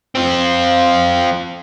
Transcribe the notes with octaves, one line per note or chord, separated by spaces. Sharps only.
C4 F4